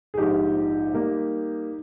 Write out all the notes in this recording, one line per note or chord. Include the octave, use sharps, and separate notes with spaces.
G#4
A#1 G#2 F3 D#4 G4
G3 A#3